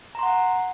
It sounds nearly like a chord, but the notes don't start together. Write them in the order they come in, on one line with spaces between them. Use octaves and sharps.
A#5 C6 F#5